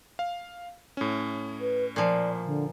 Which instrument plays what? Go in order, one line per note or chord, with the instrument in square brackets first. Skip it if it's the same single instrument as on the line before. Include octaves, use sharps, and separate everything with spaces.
[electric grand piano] F5
A2 C#4
[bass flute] B4
[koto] A#2 F3 [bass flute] D5
[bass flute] D3